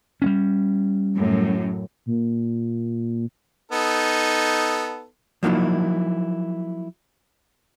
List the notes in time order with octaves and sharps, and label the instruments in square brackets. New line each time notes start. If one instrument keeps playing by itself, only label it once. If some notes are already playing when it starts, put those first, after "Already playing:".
[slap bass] G3 A#3 C#4
[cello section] F#2 A2
[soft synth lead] A#2
[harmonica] B3 D#4 A4
[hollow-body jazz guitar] F3 F#3 A#3 D#4 E4